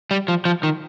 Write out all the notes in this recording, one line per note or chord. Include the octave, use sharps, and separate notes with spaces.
G3
F3
F3
D#3